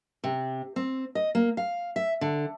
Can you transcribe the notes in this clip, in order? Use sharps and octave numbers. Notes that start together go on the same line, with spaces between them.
C3
C4
D#5
A#3
F5
E5
D3